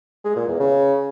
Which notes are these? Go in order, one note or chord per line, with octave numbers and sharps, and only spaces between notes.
G#3
A#2
E2
C#3